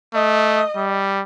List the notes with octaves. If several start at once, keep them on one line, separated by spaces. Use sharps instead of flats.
A3 D#5
G3